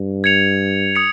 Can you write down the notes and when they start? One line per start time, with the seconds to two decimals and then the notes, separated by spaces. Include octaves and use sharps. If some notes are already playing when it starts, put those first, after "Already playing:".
Already playing: G2
0.24 G#6 C#7 F7
0.96 D#6 G#6 C#7